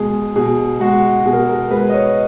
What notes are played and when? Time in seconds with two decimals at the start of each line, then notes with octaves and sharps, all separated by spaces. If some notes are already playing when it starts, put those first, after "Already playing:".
Already playing: B2 G#3 G#4
0.36 B2 G#4
0.80 G#3 F#4
1.25 B2 G#4
1.33 A#4
1.41 G#4
1.49 A#4
1.71 G#3 B4
1.89 D#5
1.93 C#5